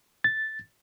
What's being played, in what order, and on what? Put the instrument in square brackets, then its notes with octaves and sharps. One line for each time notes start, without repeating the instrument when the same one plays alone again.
[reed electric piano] A6